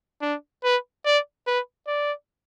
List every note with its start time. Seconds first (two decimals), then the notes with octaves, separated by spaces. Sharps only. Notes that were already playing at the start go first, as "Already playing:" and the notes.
0.22 D4
0.64 B4
1.06 D5
1.47 B4
1.87 D5